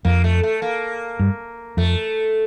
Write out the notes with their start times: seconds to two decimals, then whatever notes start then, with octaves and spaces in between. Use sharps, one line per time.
0.05 F2 A#3
0.24 A3
0.43 A3
0.62 A#3
1.20 G2
1.77 F2 A3